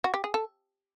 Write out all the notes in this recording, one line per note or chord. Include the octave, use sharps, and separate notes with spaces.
F#4
G4
G#4
A4